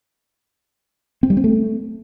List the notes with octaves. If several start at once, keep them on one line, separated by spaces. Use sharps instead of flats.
C4
G3
C4
A3